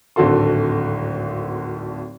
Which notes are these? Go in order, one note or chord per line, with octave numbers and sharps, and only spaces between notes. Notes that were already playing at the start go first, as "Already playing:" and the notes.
D1 G#1 D3 F#4 A4 C6